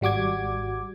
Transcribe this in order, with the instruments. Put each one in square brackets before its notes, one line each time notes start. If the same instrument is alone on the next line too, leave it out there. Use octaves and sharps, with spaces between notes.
[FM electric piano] G#1 G3 F#4 D6 G#6